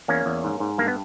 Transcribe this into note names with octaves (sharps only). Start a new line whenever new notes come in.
E2 A#3 C#4
E2
G#2
G#2
G2 A#3
B3